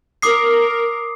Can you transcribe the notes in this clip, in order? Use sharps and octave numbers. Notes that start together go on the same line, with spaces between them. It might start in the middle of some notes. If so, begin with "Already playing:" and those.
A#4 D6 D#6 C7